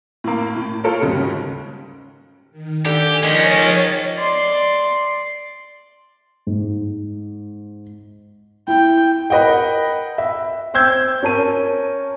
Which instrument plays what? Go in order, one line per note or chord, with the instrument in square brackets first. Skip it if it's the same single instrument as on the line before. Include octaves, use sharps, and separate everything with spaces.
[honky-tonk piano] A2 A#3
A2
F4 A4 A#4 C#5
D#2 G#2 C#3 G3
[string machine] D#3
[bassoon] D3 [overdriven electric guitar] G4 [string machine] G#5
[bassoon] D#3 [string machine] F3 C#5 A6 [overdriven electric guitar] G#3 C#4
[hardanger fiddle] D5 C6
[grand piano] G#2
[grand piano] E4 [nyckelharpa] G5
[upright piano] A#4 B4 D#5 F#5 G5
E5
C5 G5 E6 G6 G#6
C#4 A#4 A5 D#7